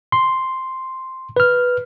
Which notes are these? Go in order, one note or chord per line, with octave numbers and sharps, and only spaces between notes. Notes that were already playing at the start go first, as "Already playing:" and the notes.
C6
B4 F6